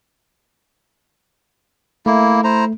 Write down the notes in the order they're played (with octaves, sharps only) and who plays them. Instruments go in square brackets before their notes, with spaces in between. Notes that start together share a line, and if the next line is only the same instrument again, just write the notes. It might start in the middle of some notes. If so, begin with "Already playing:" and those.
[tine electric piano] A3 [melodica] A#3 E4
[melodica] E4 C5 A#5